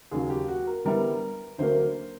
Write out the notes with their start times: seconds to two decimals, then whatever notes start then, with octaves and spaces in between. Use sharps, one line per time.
0.11 D#2 C#3 F#3 G#4
0.30 G4
0.48 F#4
0.67 A#4
0.85 D3 G3 B3 E4 A#4
1.58 D2 D3 F#3 A#3 C5